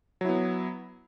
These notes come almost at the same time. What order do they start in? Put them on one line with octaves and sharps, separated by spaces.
F#3 E4 B3